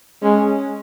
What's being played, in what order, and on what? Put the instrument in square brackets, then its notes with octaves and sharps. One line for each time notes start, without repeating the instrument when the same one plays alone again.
[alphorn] G#3 [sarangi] C#4